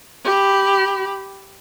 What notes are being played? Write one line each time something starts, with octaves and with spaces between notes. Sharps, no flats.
G4 B5